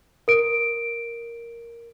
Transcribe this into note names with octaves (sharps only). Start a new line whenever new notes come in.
A#4 D7